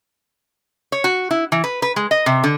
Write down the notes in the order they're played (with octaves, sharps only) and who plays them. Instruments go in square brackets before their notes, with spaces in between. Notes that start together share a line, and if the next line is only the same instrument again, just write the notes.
[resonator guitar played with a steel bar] C#5
F#4
E4
E3
B4
B4
G#3
D#5
C3
D3